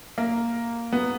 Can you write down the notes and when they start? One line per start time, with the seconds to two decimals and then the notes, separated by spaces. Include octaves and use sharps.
0.18 A#3
0.93 B3